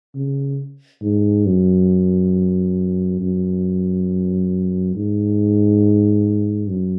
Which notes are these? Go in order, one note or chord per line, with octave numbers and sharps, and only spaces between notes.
C#3
G#2
F#2
F#2
G#2
F#2